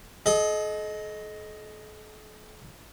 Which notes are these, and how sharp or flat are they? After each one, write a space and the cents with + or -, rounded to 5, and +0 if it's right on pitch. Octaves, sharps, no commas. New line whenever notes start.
A4 -45 D#5 +0